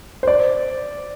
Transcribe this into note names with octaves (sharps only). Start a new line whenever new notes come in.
C5
D5